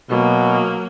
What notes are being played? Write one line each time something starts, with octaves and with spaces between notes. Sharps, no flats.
B2 F#3 A#3